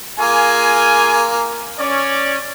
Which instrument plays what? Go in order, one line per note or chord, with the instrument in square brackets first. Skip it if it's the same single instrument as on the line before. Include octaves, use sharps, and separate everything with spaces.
[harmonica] A#3 [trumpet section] F4 G#4 G#5
[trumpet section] C#4 D5